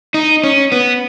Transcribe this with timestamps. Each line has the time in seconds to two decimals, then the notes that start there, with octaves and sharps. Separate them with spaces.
0.14 D#4
0.44 C#4
0.72 B3